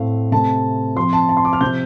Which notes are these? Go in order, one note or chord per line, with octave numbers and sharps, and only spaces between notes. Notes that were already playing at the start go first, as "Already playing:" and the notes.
Already playing: A2 A3 C4 F5
C3 A3 C4 A5
F3 C4 C6
A5
A5
C6
D6
F6
C3 F3 C4 G6